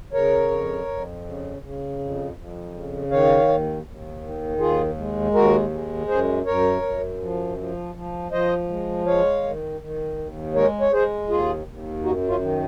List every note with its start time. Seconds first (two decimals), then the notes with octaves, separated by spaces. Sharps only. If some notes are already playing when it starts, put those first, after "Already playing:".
0.13 C#3 A#4 C#5
0.51 F2
0.88 F2
1.25 C#3
1.62 C#3
1.99 F2
2.37 F2
2.74 C#3
3.10 D#3 C#5 F5
3.48 D#2
3.85 D#2
4.22 D#3
4.59 D#2 F4 G#4
4.98 G#3
5.34 D#2 F#4 A#4
5.71 G#3
6.08 F#2 G#4 C5
6.46 F#2 A#4 C#5
6.82 F#2
7.20 F3
7.58 F3
7.95 F3
8.31 F3 C5 D#5
8.69 G#3
9.06 G#3 C#5 F5
9.43 D#3
9.81 D#3
10.18 D#2
10.55 G#3 A#4 C#5
10.81 C#5
10.92 G#3 G#4 C5
11.29 D#2 F4 G#4
11.67 D#2
12.03 F#2 D#4 F#4
12.28 C#4 F4
12.41 D#3